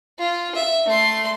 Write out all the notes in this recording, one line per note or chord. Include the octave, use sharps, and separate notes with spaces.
F4
E5
A3 C6